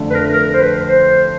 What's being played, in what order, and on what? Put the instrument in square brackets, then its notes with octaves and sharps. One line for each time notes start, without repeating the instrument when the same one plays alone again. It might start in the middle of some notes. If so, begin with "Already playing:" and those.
Already playing: [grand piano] F2 D3 F3 A3
[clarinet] B4
A#4
A#4
C5
B4
C5